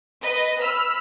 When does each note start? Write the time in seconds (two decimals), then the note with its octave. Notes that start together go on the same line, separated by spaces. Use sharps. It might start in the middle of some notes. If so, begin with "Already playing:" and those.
0.21 B4 D#5
0.61 B5 E6 F6